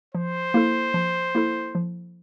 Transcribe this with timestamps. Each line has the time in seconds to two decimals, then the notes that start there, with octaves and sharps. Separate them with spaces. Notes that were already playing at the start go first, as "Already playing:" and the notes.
0.14 F3 C5
0.54 A#3 E4 A4
0.94 F3
1.35 A#3 E4 A4
1.75 F3